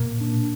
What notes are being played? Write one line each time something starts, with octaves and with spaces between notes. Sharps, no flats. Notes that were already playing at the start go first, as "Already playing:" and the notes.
Already playing: A#2 A#3
D4